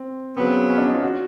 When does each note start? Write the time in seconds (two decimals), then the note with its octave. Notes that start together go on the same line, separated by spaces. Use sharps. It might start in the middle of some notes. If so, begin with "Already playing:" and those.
Already playing: C4
0.37 C#3 F#3 B3 C4
0.70 C#4
0.78 D4
0.86 D#4
0.94 F4
1.03 F#4